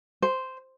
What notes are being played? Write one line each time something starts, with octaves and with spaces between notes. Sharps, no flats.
C5